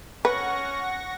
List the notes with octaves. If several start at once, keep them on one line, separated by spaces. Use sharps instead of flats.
C#4 B4 F#5 C#6 A#6